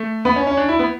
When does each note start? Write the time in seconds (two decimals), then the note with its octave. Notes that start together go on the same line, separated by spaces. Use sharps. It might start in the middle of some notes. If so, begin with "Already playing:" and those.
Already playing: A3
0.25 B3
0.36 C#4
0.47 C#4
0.57 D4
0.68 E4
0.79 B3